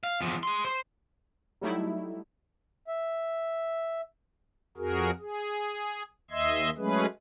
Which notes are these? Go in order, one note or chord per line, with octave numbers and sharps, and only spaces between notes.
F5
E2 F3
G#4 C6
C5
F#3 G3 A3 D#4 E4
E5
F2 F#4 G#4 A#4
G#4
D#2 D#5 E5 C6 E6 G#6
F#3 G#3 A3 C#4 G#4 B4